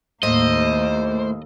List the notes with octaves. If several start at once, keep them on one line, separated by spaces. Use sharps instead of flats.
D#2 A2 A#3 C5 D#5